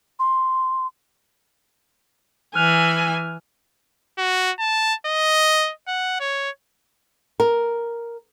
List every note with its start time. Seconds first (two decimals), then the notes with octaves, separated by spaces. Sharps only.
0.19 C6
2.55 E3 G#5 F6 F#6 F7
4.18 F#4
4.59 A5
5.06 D#5
5.88 F#5
6.20 C#5
7.40 A#4